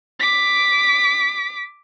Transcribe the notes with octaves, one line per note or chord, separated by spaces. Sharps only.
D6 B6